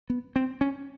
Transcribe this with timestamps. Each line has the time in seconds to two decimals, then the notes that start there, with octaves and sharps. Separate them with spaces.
0.10 B3
0.36 C4
0.61 C#4